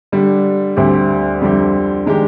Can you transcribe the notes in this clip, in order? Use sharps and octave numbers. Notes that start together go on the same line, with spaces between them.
D3 G3 D4 G4
D2 D3 G3 C4 G4
F2 D3 G3 C4 G4
D#3 G#3 D4 G4